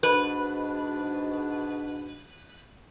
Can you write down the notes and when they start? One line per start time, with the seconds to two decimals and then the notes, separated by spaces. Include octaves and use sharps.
0.03 G#2 B2 D4 B4